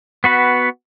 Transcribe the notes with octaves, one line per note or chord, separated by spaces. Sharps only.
B3 F#4 B4